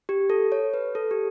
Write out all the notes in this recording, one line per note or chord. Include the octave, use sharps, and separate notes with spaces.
G4
A4
C#5
B4
A4
G4